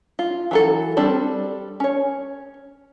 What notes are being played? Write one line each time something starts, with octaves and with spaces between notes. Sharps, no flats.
F4
E3 F#3 A4
G3 C4 D4 A4 D5
C#4 C#5